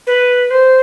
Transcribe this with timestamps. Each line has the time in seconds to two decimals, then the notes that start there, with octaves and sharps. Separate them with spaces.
0.07 B4
0.51 C5